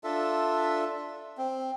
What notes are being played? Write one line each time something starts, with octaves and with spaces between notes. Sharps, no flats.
D4 F4 A4 E5
C4